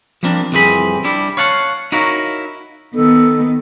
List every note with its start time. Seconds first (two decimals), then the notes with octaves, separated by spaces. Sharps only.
0.23 F3 G3 A#3 C4 D4
0.52 C2 F2 E3 C4 G#4 B5
1.04 G3 D4 E4
1.37 C#5 F5 F#5 A5
1.92 D#4 E4 F#4 A#4 C#5 F5
2.95 D#3 B3 A4